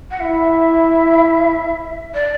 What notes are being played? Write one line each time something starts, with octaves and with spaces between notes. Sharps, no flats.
F#5
E4 E5
D5